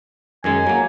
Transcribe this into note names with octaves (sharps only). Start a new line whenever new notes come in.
F#2 D#3 G#3 G#5
F#3 A#3